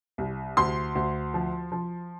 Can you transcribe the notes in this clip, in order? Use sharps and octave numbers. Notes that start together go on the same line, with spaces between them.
C2
D2 C6
D2
F3
F3